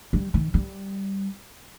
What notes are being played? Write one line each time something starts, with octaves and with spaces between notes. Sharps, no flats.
G3
D#3
G3